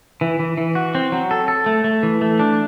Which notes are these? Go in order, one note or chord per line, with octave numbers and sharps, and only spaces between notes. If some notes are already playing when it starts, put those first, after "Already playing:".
E3
E3
E3
F#4
C4
F#3
A4
A4
A3
A3
E3
A3
D4